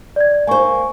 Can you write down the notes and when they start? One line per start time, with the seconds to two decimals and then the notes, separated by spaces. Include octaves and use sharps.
0.16 D5 G#6
0.47 A#3 C5 G#5 C#6